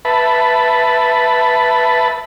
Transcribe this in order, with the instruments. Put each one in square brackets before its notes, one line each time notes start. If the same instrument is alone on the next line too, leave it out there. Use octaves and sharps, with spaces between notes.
[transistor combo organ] B4 E5 A5 B5